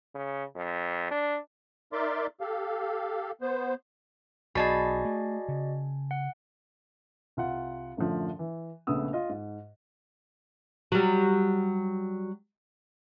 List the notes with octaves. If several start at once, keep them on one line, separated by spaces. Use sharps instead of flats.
C#3
F2
D4
D#4 A#4 D5 E5 C6 D6
G4 A4 F5
B3 C5
B1 F#4 G#4 D5 D#5 A5 B5
A3
C#3
F#5
C2 F4 F#5
F#2 A2 D3 F3
E3
A#1 C#3 A3 B3 D#6 E6
F4 D#5
G#2
F#3 G3